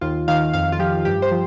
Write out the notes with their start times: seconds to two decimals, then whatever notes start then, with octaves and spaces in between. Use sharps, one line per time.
0.01 D#2 F4
0.28 D#3 F5
0.53 F2 F5
0.72 F4
0.79 F3 G4
1.05 G2 G4
1.22 C5
1.31 F3